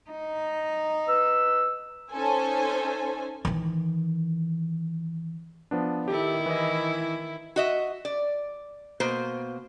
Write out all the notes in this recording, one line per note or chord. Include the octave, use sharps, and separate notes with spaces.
D#4
B4 E6
C#4 D#4 A4 C5 G#5
D#3 E3
F3 B3 D4
D#3 E4 G4 A4
E3 D#5
F#4 D#5 E5
D5
B2 A#3 C5